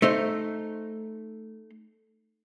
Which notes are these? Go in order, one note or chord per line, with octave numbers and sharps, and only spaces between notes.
A3 D#4 C5